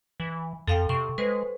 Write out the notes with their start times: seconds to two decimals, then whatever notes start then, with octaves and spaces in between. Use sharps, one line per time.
0.20 E3
0.68 F2 A4 F5 G5
0.89 C3 C#6
1.18 G#3 B4 C5